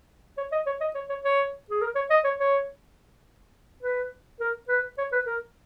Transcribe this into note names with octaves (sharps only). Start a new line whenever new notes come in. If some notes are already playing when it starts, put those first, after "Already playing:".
C#5
D#5
C#5
D#5
C#5
C#5
C#5
G#4
A#4
C#5
D#5
C#5
C#5
B4
A#4
B4
C#5
B4
A#4